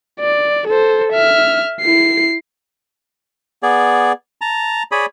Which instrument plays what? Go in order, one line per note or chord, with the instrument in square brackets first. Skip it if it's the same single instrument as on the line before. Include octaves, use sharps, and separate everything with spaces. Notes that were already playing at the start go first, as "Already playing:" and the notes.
[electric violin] D5
A4 C5
E5 F6
E4 C7
[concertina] B3 G#4 D5
A5 A#5
G#4 C#5 D5 B5 D#6